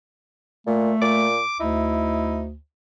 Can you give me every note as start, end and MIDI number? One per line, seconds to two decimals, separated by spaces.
0.67 0.92 46
0.67 1.29 57
1.02 1.40 46
1.02 1.60 86
1.60 2.56 38
1.60 2.46 63
1.60 2.41 64